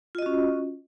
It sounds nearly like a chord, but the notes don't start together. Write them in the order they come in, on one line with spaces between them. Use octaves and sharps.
F4 D#5 F#4 C#4